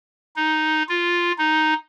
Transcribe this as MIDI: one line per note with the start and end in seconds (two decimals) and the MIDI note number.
0.36 0.83 63
0.89 1.32 65
1.38 1.74 63